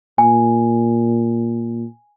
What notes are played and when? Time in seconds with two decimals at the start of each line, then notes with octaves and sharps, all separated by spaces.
0.18 A#2 G#5